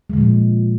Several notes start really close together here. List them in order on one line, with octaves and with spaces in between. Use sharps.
G#3 D3 A#2 F3